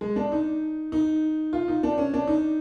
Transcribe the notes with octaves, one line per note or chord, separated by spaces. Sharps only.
G#3
D4
D#4
D#4
F4
D#4
D4
C#4
D4
D#4